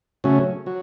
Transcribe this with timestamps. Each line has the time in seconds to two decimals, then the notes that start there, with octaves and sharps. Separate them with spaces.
0.24 C#3 F#3 A3 C#4
0.66 F#3